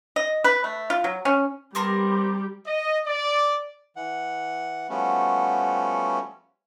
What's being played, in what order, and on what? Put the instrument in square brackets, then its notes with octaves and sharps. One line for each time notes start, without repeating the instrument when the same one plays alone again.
[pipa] D#5
B4
A3
F4
F#3
C#4
[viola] G3 G4 [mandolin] B3 C4 A#4
[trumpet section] D#5
D5
[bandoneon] E3 F#5
F3 G3 A3 B3 C#4 F#4